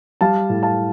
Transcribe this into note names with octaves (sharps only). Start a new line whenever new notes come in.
G3 F5 A5
A2
F5 A5